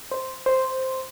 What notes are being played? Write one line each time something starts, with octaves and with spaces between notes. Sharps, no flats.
C5
C5